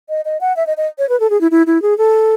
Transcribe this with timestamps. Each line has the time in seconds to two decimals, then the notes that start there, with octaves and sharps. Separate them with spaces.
0.09 D#5
0.25 D#5
0.41 F#5
0.56 E5
0.67 D#5
0.77 D#5
0.98 C#5
1.09 B4
1.20 A4
1.30 G#4
1.41 E4
1.51 E4
1.67 E4
1.82 G#4
1.98 A4